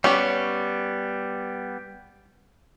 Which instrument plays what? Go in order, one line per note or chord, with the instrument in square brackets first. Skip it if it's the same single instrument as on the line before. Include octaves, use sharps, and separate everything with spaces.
[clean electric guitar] G3 B3 [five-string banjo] C#4 G4